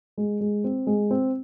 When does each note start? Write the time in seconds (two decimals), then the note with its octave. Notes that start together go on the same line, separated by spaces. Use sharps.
0.17 G#3
0.41 G#3
0.64 C4
0.87 G#3
1.11 C4